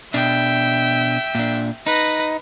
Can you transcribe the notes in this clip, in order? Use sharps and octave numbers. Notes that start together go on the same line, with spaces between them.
B2 D4 E5 G5
A#2 D4
D#4 B4 A#6